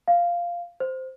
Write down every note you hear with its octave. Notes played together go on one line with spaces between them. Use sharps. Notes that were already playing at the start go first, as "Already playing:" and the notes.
F5
C5